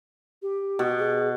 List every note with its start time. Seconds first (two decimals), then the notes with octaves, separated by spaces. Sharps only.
0.42 G4
0.79 B2
0.99 G#4